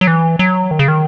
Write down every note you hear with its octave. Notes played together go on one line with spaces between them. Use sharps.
F#3
E3
F#3
D#3
C#3
D#3